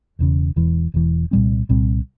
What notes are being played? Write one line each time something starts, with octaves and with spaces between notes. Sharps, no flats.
E1 E2 C#3
E1 E2 E3
E1 E2 E3
C2 A#2 G3 C4
C2 A#2 G3 C4